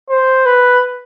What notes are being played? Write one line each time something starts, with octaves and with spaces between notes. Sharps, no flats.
C5
B4